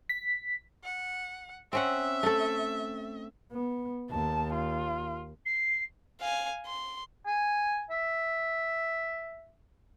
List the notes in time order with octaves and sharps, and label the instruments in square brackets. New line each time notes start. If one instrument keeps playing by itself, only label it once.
[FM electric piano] B6
[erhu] F#5
[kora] C4 C#4 F#5 [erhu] E5
[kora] A3 A4
[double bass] B3
[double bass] D#2 [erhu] A5
[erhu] F4
[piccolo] C7
[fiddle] F5 G#5
C6
[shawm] G#5
E5